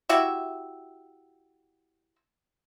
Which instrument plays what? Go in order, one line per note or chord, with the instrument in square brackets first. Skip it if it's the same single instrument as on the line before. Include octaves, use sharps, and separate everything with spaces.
[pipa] E4 F#4 G4 E5